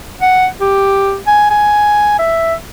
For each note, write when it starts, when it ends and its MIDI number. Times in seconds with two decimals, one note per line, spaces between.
0.21 0.47 78
0.61 1.17 67
1.27 1.50 80
1.50 2.15 80
2.19 2.54 76